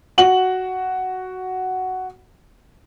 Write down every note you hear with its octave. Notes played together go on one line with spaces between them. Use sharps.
F#4 F#7